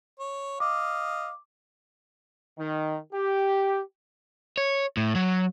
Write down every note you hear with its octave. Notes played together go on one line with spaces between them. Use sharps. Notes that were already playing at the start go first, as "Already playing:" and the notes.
C#5
D#5 F5 D6
D#3
G4
C#5
A2
F#3